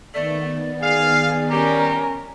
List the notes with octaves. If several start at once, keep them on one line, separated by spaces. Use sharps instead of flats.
D#3 A3 B3 D5
G#4 F5
G3 C#4 G4 A#4